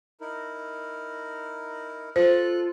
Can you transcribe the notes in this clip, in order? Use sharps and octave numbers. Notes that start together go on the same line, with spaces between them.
D#4 E4 A#4
F4 A4 C5 F#6